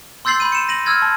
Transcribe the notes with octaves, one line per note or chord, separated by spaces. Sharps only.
C6 E6 G6 A6 C7 F#7
B5 G6 D#7
C#7 E7
A#6 D#7 F#7
E6 F6 G#6 A6
A5